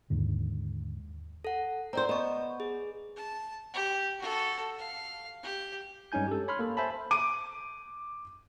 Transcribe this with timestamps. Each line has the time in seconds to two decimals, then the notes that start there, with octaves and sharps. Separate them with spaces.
0.10 D#2 G#2 D3
1.44 A4 F#5
1.93 C4 C5 D5 A#5
2.09 B3 D#5 C#6
2.60 G#4
3.16 A5
3.74 G4
4.19 F#4 A4
4.78 F5
5.43 G4
6.12 G2 G#3 C#4 D#4 G#5 G6
6.28 G4 A4
6.48 C#5 B5 C6 F6
6.59 A#3 A4
6.77 C5 E5 G#5 A5 B5
7.11 D6 D7 D#7